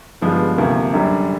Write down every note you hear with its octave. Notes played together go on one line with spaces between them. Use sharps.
G2 D3 F3 G#3 B3
D2 C3 F3 A#3
F#2 D3 G3